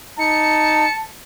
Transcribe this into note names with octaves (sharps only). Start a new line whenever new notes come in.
D#4 A5 C#7